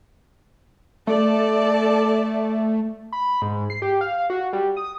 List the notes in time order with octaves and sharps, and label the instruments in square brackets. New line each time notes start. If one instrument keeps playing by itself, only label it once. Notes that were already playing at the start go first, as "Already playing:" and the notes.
[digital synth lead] A3 [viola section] A4 D5 A5
[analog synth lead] B5
G#2
C7
G4
F5
F5
F#4
G3
D#6